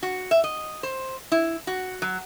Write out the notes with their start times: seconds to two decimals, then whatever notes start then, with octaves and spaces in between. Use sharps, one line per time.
0.03 F#4
0.31 E5
0.44 D#5
0.83 C5
1.32 E4
1.67 F#4
2.02 F#3